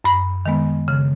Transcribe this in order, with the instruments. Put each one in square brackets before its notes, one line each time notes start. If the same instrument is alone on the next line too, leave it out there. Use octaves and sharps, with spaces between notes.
[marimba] F#2 B5
D#3 G#3 B3
C#3